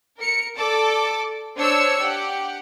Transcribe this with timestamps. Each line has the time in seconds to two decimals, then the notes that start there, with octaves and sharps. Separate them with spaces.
0.18 A#4 C#7
0.56 A4 D5 A5 D6
1.58 D4 C5 C#5 E6 G#6 C#7
2.01 G4 F#5